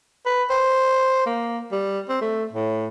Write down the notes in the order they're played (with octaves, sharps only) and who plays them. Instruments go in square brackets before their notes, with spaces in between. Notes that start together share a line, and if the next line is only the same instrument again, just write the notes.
[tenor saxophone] B4
C5
A#3
G3
C4
A3
A2